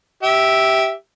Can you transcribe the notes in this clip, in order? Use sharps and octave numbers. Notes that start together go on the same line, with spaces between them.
G4 E5